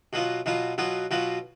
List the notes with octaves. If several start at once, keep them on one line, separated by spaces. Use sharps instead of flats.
B2 F#3 B3 F4
B2 F#3 B3 F4
B2 F#3 B3 F4
B2 F#3 B3 F4